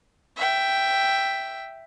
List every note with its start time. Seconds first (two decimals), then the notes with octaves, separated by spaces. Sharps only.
0.37 E5 G5